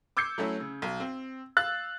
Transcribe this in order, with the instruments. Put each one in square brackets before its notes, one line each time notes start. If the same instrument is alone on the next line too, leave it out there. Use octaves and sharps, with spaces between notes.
[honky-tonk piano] D6 E6 G6 G#6 C7 C#7
F#3 A3 C#4 E4
C#3
B1
C4
F5 E6 F#6 A6